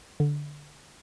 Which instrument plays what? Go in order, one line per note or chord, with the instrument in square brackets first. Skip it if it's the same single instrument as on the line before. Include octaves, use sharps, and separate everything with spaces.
[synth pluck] D3